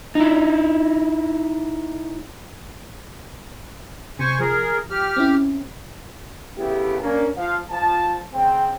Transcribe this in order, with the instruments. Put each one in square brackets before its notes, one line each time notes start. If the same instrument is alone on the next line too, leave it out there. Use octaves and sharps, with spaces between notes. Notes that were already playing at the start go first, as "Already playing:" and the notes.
[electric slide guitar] D#4 E4
[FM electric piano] C3 [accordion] C5 G#5 C#6
[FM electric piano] F3 [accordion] G#4 A#4
[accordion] G4 F6
[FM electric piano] C4 C#4 E4
[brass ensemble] C#3 A3 B3 E4 G4
A#3 C#4 D4 A#4
F3 F5
F3 A5
C#3 C4 G5